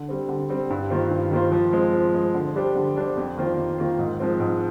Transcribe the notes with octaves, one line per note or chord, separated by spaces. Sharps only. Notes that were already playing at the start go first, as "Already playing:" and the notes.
Already playing: D3
G3 C4
D3
G3 C4
G2
D#3 A#3 F4 C5
G2
D#3 A#3 F4 C5
F3
G#3 C4
F3
G#3 C4
D3
G3 D4 G4 C5
D3
G3 D4 G4 C5
F2
D#3 A#3 F4 C5
F2
D#3 A#3 F4 C5
G#2
F3 G#3 C4
G#2